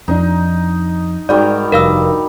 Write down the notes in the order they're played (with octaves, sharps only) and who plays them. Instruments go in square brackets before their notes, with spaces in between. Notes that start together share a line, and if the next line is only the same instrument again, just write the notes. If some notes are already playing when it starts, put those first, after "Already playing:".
[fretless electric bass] F2 C4 D4 [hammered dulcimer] D#4
[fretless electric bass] G#2 [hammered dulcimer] D#3 G3 F#4 [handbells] D5
[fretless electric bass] F1 G2 [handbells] A#4 F5 E6